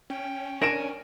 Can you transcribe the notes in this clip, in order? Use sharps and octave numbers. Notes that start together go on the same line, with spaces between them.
C#4 G5
D4 A#4 C#5 G#5 A#6 D7 E7